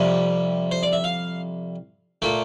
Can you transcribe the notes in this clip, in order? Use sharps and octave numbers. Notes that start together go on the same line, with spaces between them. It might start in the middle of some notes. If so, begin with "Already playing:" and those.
Already playing: F2 C3 G3
C5
D5
E5
F5
A#2 A3 G5